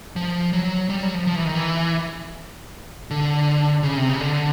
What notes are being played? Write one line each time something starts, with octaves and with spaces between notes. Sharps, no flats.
F3
F#3
G3
F#3
F3
F3
E3
D#3
E3
D3
C#3
C3
C#3
D3